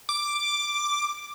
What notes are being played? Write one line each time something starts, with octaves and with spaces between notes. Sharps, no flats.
D6